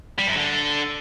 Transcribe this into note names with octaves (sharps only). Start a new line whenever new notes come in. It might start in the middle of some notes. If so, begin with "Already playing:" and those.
G3
F#2
D3